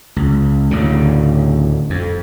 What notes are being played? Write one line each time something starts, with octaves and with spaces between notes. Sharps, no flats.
C#2
D2 A2 C#3
F2